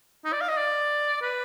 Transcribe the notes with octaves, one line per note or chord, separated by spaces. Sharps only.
D#4
D5
F5
D#5
D5
B4